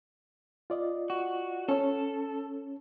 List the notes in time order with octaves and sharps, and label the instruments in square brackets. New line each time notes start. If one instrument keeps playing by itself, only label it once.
[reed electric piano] F4 D5 D#5
[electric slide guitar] F#4
[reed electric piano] C#4 C#5 [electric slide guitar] A4